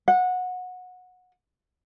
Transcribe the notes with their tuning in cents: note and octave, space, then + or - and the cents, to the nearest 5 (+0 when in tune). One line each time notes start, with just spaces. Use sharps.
F#5 -20